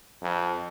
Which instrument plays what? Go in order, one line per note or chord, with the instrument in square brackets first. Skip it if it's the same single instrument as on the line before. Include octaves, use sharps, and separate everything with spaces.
[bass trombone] F2